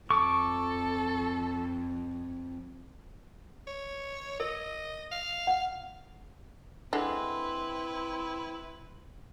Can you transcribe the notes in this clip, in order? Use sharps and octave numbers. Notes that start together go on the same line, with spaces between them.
F2 A4 C#6 D6
C#5
A#4 D#5
F5
F#5
D3 G#3 C4 E4 B4